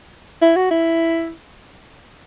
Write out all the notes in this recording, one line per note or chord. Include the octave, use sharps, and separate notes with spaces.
E4
F#4
E4